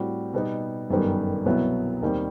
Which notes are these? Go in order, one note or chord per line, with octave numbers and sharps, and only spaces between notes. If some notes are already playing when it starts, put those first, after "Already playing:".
Already playing: A2 G3 C4 F#4
B2 G3 B3 D#4
G1 F#2 D#3 G3 B3
C2 B2 F#3 B3 E4
D#2 D#3 G3 C4